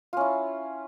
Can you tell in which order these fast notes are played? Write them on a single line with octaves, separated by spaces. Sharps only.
F4 C#4 E4